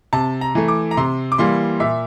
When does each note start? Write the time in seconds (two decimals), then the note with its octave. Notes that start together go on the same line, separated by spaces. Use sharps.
0.13 C3 A5
0.41 A#5
0.55 E3 A3
0.68 D6
0.91 A#5
0.97 C3 C6
1.32 D6
1.38 E3 G3 A#3 C6
1.80 A#2 E5